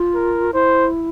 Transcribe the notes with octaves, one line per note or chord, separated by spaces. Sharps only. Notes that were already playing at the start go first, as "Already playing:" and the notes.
Already playing: F4
A#4
E4 C5